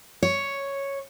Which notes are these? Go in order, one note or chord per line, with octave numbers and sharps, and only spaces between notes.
C#5